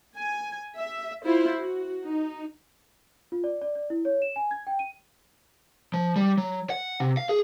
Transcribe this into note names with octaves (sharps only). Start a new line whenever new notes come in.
G#5
E5
E4 F4 C5
F#4
D#4
F4
D5
D5
D5
E4
C#5
E7
G#5
G#6
G5
D#7
F3
G3
F#3
F#5
C3
F5
G#4